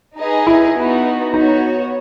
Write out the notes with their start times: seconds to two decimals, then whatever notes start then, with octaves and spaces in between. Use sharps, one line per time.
0.17 D#4 G#4 B4 D#5
0.47 E4
0.75 B3 D#4 F#4
1.34 B3 D#4 F#4 C#5